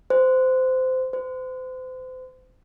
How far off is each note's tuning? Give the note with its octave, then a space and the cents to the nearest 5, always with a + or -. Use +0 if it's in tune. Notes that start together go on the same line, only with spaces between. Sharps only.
C5 -20
C5 -35